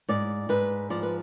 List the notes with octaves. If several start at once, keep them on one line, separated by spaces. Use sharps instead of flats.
G#2 D5
G#2 B4
F3 D5
B4